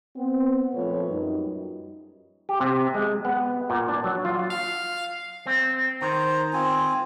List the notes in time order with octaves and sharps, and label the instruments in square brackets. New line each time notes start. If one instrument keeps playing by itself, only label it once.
[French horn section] B3 C4
A#2 F3 A3 C4 B4 C#5
F#2 G3 D#4
[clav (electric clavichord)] G4
C3
G#3
B3
A#2
D4
F#3
F4
[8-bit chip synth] F5
[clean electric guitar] C4
[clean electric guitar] D#3 [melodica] C5 A#5
[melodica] C4 F4 G#5